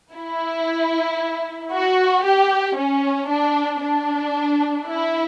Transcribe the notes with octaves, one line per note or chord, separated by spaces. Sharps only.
E4
F#4
G4
C#4
D4
D4
E4